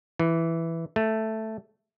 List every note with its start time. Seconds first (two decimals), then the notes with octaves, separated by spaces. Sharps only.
0.19 E3
0.96 A3